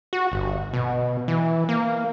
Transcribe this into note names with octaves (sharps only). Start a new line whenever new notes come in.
F#4
G1
B2
E3
A#3